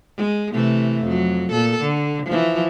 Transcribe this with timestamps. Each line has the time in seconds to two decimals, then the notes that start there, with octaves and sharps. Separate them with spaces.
0.17 G#3
0.52 C3 E3 A3
1.04 F2 F#3
1.52 A#2 A4
1.82 D3
2.26 E3 F3